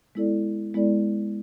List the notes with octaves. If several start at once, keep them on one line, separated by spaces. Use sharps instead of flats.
G#3 B3 E4 A4 D5
G#3 B3 E4 A4 D5